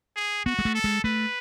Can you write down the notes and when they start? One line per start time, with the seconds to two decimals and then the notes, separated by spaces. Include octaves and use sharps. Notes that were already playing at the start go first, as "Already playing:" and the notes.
0.16 G#4
0.46 B3 F#4
0.59 G#3
0.65 A3
0.75 A4
0.84 G#3
1.04 A3 B4